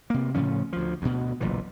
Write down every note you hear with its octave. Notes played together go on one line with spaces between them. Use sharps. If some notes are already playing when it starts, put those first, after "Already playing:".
C3 A#3
A2 C#3 F3 C#4
D2 F3
D2 B2
F#1 B1 A#2 E3